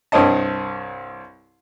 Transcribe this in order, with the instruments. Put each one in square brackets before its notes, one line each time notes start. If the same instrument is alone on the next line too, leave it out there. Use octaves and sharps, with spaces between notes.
[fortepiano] C2 G2 C4 C#5 D#5 A5